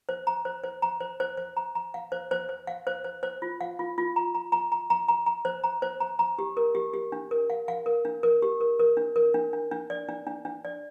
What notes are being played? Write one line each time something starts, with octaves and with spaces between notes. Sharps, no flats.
C5
A#5
C5
C5
A#5
C5
C5
C5
A#5
A#5
F5
C5
C5
C5
F5
C5
C5
C5
F4
F5
F4
F4
A#5
A#5
A#5
A#5
A#5
A#5
A#5
C5
A#5
C5
A#5
A#5
G4
A#4
G4
G4
D4
A#4
F5
F5
A#4
D4
A#4
G4
A#4
A#4
D4
A#4
D4
D4
D4
D5
D4
D4
D4
D5